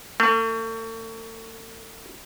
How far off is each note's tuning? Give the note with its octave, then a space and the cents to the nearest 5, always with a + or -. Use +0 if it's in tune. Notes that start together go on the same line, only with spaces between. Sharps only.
A3 +40